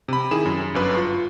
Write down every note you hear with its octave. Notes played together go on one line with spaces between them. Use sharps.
C3 B5
D#3 E4 G#4 E7
F#2
G1 F#2 B4
F4 C#6